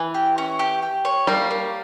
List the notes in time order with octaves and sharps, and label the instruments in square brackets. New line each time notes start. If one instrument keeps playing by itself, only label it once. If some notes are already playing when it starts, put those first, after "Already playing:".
Already playing: [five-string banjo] E3
[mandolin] G4
C#4
G4
G4
C#5
[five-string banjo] G3 [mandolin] A#3
[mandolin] A#3